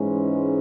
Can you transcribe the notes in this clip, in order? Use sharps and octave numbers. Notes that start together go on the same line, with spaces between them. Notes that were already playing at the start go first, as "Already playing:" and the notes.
Already playing: G#2 E3 G#3 C#4